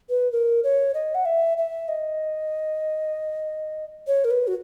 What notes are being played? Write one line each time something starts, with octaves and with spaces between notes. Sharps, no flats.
B4
A#4
C#5
D#5
F#5
E5
E5
D#5
C#5
A#4
B4
F#4